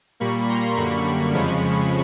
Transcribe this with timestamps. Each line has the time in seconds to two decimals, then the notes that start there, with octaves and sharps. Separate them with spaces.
0.20 A#2 G3 A#3 B5 C#6
0.49 A#5 C6
0.77 F#2 D3 G3 A#3 B5 C#6
1.34 F2 C#3 F3 G#3